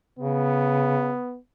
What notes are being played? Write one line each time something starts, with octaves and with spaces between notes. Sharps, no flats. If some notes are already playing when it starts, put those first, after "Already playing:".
C#3 B3